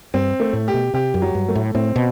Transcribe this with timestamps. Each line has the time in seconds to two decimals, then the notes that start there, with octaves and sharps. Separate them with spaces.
0.14 G2 C4
0.40 A3
0.53 A2
0.68 G4
0.74 B2
0.94 C3 G4
1.14 F#2
1.22 F#3
1.35 G2
1.48 A3
1.55 A2
1.75 A2 C4
1.96 B2